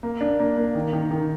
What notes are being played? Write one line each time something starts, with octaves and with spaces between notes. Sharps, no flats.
A#3
D4
A#3
A#3
D#3
D#3
D#3